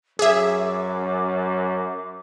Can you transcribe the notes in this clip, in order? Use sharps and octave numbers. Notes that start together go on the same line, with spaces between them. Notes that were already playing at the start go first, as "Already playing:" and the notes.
F#2 G#4 E5 D6